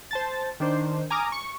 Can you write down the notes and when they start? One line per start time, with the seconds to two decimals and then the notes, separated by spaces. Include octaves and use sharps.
0.11 C5 A5 A6
0.60 D#3 D4 C5
1.10 G#5 A#5 D6 D#6 F6
1.32 C#6